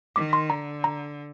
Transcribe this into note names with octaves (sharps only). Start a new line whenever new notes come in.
D#3 D6
C6
D3 A#5
A#5